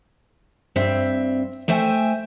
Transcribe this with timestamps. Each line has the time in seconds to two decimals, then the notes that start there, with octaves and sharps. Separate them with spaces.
0.76 G2 C4 E5
1.68 A3 C5 E5 G5 G#5